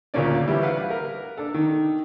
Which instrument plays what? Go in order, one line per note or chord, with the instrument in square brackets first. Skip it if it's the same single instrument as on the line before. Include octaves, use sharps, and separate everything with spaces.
[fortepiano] D2 A#2 C#3 A#3 C#4 D5
E3 G3 E4
B4 F5 F#5
A#4
D4 A4
D#3